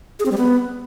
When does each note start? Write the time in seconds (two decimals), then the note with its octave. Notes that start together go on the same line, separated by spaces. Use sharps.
0.19 G#4
0.25 C4
0.32 G3
0.38 B3